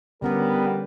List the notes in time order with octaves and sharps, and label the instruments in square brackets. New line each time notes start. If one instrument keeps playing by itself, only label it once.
[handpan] D3 C#4 B4 [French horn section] G3 [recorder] B3 [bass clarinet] A#4